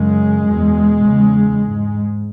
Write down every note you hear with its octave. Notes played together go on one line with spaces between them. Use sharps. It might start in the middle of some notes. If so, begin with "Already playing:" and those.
Already playing: F#2 C#3 G#3
E2 B2
E2 C#3
G#2